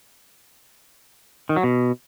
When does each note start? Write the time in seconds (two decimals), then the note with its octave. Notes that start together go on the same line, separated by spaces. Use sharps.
1.49 D#3
1.56 F#3
1.63 B2